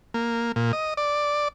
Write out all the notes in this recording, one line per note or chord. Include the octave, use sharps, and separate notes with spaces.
A#3
A#2
D#5
D5